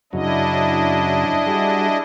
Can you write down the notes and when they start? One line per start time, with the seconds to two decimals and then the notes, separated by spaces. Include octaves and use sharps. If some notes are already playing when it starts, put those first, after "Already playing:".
0.13 F#2 C#3 F#3 D4 E4 D#5
1.47 G3 F#4 G#4